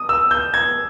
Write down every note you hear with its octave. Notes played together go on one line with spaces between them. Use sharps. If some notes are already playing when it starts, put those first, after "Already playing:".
Already playing: D#6
E6
G6
G#6